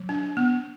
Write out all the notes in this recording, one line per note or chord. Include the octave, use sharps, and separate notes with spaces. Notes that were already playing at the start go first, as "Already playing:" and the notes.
Already playing: F#3
D4
B3